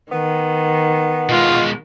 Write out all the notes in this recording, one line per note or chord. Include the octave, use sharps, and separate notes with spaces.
D#3 B3
B2 G#3 F4